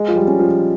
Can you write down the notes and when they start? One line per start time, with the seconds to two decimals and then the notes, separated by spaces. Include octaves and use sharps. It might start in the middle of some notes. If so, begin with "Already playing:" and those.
Already playing: G#3
0.08 F3
0.16 G3
0.28 C#4
0.39 F3